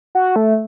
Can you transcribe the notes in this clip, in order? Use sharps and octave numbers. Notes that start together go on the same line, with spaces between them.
F#4
A3